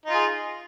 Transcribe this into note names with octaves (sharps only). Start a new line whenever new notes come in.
D#4 F4 G#4